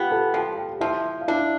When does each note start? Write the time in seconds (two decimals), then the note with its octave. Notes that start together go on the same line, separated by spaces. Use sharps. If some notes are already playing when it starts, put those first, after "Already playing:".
Already playing: B3 F4 G4 F5 G5
0.11 A4 A5
0.34 F3 G4 G5
0.58 G4 G5
0.81 F3 E4 E5
1.21 F5
1.28 D4 E4 E5